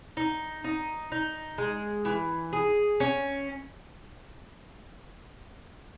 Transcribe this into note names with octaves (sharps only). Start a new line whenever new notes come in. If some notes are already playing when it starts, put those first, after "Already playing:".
D#4
D#4
D#4
G#3
E3
G#4
C#4